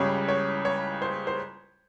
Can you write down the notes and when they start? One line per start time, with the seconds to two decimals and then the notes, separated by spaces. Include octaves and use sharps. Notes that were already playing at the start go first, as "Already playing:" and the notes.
Already playing: C#2 C#3 G3 C#5
0.29 C#5
0.65 C#5
1.02 C5
1.27 C5